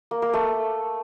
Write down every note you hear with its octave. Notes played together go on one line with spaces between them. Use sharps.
A#3
A#3
A3